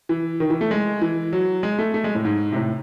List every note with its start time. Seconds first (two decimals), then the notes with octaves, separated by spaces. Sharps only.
0.09 E3
0.40 D#3
0.50 E3
0.61 A3
0.71 G#3
1.02 E3
1.33 F#3
1.63 G#3
1.79 A3
1.94 A3
2.04 G#3
2.15 A2
2.25 G#2
2.52 C3
2.56 A2